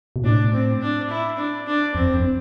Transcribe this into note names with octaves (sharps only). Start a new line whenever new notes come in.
B2
A2 D4
C4
D4
E4
D4
D4
F2 C4
F2